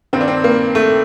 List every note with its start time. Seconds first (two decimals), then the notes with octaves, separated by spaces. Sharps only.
0.13 G2 D#3 C4
0.21 D4
0.28 C4
0.44 A#3
0.75 A3